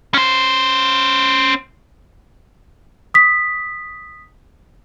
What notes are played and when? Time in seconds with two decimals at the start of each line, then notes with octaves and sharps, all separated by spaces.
0.14 C#4 C5
3.14 D#6 B6